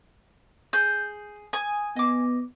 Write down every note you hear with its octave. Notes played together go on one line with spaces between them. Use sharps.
G#4 G6
G#5 D#6
B3 D#5 D6